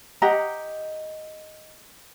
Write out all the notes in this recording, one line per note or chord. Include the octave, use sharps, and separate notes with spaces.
G4 D#5 F#5 A#5